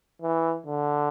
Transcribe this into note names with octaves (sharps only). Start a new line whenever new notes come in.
E3
D3